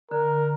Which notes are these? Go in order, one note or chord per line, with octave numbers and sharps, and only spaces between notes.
D3 A#4